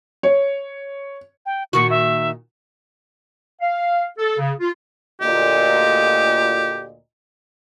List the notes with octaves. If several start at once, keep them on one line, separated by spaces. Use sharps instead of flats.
C#5
G5
A#2 D#3 F#4 C#6
E5
F5
A4
C#3
F4
D2 A#2 G4 D#5